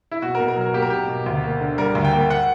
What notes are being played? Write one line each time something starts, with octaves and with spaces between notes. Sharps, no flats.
E4
B2 F#4
A#4
B2
A#4
F#3
A#4
A#3 G4
A#4
B2 G4
B2
D2
A#3
D3
G3 A#4
D2
G5
A#3
F#5